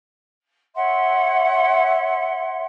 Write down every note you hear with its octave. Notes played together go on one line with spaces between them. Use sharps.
C#5 E5 F#5 C6